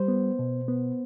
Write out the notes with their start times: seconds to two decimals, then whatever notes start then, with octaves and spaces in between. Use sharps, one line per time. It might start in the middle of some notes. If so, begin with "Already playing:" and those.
Already playing: G3 C5
0.08 B3
0.39 B2
0.68 B3